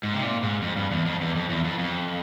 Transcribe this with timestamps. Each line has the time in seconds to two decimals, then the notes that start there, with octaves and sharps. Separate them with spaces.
0.03 G#2
0.14 C3
0.23 A#2
0.43 G#2
0.62 F2
0.76 G2
0.91 E2
1.05 F2
1.21 E2
1.35 F2
1.50 E2
1.65 F2
1.79 F2